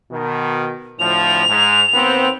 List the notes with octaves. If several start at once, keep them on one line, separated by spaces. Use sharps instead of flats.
B2 D#3
D2 A2 F3 F7
G#2
D#2 B3 C4